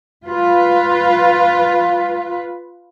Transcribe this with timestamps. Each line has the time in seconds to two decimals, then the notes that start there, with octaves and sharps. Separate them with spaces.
0.25 F4 B4